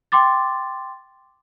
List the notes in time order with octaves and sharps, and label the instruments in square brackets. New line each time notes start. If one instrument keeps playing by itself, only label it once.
[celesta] G5 C6 D6 A6